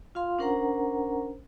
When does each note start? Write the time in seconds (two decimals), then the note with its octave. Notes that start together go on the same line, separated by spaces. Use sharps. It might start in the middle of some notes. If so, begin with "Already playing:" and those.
0.15 F4 F5 C6
0.39 C#4 D4 A#4 C5 F#5 A#5